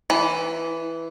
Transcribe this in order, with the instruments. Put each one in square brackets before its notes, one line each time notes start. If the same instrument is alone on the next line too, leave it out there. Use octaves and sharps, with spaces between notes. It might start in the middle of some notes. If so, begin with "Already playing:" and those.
[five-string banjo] E3